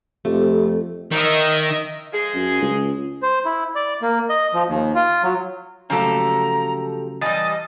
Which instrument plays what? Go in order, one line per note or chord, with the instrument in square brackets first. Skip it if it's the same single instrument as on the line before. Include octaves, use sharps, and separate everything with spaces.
[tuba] F2 [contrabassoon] C3 [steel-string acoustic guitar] A3
[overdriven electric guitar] D#3 [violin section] D#5 E5
[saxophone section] F3 G#3 G#4
[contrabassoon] F#2
C#2
[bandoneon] C5
E4
D5
A#3
D#5
F3
D#2
F4
F#3
[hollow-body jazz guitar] C#3 F#3 A3 [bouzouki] F3 G4 A4 [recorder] A#5
[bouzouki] E3 G3 [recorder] D#5 [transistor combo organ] A5 D#6